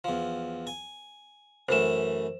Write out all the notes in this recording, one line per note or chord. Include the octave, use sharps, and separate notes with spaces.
E2 F3
G#5
F#2 E3 A3 C5 E7